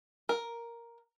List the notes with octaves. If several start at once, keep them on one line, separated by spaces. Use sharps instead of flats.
A#4